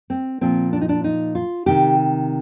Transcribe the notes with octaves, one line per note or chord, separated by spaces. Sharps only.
C4
A#2 F3 C4
D4
D#4
D4
D#4
F4
C3 D#3 G4